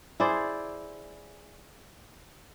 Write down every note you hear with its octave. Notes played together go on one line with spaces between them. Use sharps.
E4 G#4 C5 D5